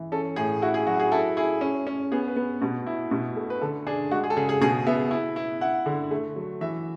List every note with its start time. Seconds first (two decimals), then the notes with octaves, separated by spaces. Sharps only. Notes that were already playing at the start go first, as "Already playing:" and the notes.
Already playing: E3
0.12 C#4 A4
0.36 A2 G#4
0.62 E4 F#4
0.74 G#4
0.87 F#3 F#4
1.00 G#4
1.12 E4 A4
1.37 E4 G#4
1.61 C#4
1.87 C#4
2.12 B3 G#4
2.28 B4
2.36 B3
2.61 B2
2.87 E4
3.11 B2
3.36 A3
3.50 B4
3.61 D3 A4
3.87 D4 G#4
4.11 G#3 F#4
4.24 G#4
4.30 A4
4.37 C#3 G#4
4.49 G#4
4.61 B2 G#4
4.87 B3 E5
5.11 E4
5.36 E4
5.61 E4 F#5
5.86 D3
6.11 A3
6.36 F#3
6.61 E3 E5